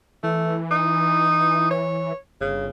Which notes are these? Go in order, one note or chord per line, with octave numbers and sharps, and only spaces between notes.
E3 A3
D#4
C#5
G1 C#3